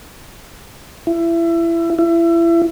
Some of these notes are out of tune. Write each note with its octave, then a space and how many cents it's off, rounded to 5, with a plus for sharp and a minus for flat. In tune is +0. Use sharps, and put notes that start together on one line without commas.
E4 +25
E4 +30